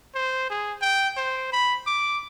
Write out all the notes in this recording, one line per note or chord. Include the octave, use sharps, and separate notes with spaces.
C5
G#4
G5
C5
B5
D6